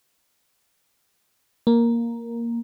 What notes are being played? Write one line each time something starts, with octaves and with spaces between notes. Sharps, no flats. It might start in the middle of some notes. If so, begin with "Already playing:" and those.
A#3